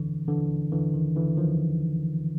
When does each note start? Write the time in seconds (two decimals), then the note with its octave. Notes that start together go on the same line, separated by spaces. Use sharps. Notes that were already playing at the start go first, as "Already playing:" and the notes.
Already playing: D3 E3
0.28 D3 E3
0.72 D3 E3
0.94 D#3
1.16 D3 E3
1.37 D#3 F3